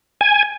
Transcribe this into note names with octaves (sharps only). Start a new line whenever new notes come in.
G#5